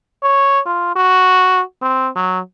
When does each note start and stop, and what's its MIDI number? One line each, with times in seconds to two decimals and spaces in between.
0.23 0.60 73
0.66 0.93 65
0.96 1.62 66
1.82 2.09 60
2.16 2.40 54